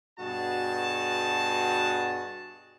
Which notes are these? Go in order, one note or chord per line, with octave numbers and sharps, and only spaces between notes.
G2 B2 F#4 G#4 A5